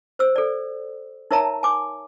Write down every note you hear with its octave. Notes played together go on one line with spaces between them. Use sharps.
C5 E6
A4 D5
D#4 A#4 C#5 E5 A5 A#5
G#5 D6